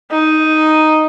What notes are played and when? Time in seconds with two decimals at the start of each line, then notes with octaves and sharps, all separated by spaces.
0.11 D#4